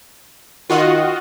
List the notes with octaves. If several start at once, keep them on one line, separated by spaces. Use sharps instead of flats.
D#3 F4 F#4 D#5